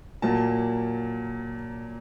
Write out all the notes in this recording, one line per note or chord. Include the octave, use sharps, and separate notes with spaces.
A#2 F#3 A#3 A5